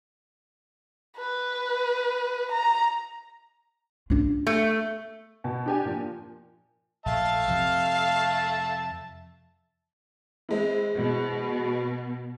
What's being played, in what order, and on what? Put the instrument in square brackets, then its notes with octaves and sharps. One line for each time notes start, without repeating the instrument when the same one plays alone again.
[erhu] B4
A#5
[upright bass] D4 F4
[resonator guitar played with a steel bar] A3
[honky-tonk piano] B2
D4 G4 G#5
A#2 F3
[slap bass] A#1 [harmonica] E5 A5 [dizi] F5
[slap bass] F2 C3 F3
[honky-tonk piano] E3 G#3 C4
[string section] B2